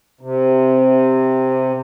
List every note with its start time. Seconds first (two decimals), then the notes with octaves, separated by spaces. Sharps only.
0.21 C3